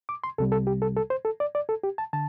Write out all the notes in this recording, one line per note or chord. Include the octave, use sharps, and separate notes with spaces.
D6
C6
C2 C3 G3 A4
A4
G4
A4
A4
C5
A4
D5
D5
A4
G4
A5
D3 A5